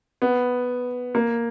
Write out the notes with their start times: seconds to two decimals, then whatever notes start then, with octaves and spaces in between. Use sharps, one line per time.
0.22 B3
1.15 A#3